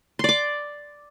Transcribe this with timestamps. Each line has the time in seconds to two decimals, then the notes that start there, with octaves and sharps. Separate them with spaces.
0.19 C6
0.24 D5
0.29 D6